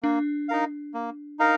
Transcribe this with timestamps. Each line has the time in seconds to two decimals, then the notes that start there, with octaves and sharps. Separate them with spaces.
0.03 A#3 D4
0.49 D#4 A#4 F5
0.94 A#3
1.39 D#4 A#4 F5